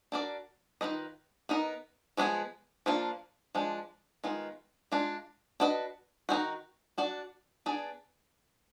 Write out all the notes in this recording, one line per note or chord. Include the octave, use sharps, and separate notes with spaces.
D4 F#4 A#4 D5
D#3 A#3 F4 B4 D#5
B3 D#4 A#4 D#5
F3 G#3 B3 D4 G#4
F3 A#3 D4 F4
F3 G#3 D4
D#3 G#3 B3 F4
G#3 D4 F4
D4 F#4 B4 D#5
D#3 G#3 D#4 F#4
D4 F#4 D5
B3 D4 G#4 D5